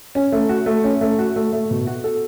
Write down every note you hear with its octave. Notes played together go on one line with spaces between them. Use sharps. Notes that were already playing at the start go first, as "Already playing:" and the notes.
C#4
A3
F#4
A3
C#4
A3
F#4
A3
A3
B2
F#4
A4